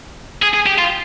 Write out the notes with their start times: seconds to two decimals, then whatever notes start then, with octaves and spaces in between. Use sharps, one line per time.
0.42 G#4
0.54 G#4
0.66 G4
0.78 F4